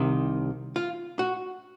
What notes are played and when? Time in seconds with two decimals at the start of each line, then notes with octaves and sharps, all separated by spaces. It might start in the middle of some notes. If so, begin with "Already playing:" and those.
Already playing: C2 C3 D#3
0.76 F4
1.19 F#4